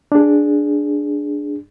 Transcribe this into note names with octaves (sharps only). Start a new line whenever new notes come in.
D4 G#4